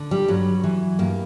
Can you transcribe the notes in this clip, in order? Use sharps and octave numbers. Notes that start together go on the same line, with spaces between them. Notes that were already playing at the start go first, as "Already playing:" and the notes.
Already playing: D3
G3
G2 F#3
E3
G2 A#3